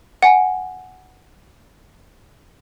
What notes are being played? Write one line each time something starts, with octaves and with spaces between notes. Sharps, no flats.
F#5 G#5